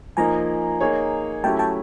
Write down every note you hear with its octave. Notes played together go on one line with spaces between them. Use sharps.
F3 A#3 D#4 G#5 A#5
A#3 D#4 G#4 C#5
F#3 A3 C#4 E4 G4 G5 A5
G5 A5